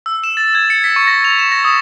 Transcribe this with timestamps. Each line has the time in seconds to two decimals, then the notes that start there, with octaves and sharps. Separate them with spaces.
0.06 E6
0.24 E7
0.37 A6
0.55 G#6
0.70 C#7
0.84 B6
0.96 C#6
1.07 A#6
1.25 F7
1.39 E7
1.52 A#6
1.65 D#6